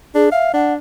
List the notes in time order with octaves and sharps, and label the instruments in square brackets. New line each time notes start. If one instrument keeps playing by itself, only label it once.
[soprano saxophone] D4 [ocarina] G#4
[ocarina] E5 [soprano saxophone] F5
[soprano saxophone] D4 [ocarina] F#5